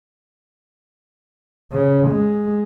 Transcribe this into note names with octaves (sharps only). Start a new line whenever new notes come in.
C#3
G#3